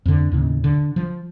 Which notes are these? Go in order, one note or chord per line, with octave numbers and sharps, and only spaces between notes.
F2 D3
D#2 A2 C#3
D3
F3